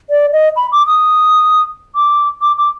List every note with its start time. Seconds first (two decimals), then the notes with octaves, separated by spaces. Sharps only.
0.10 D5
0.33 D#5
0.56 B5
0.72 D6
0.87 D#6
1.95 D6
2.41 D6
2.58 D6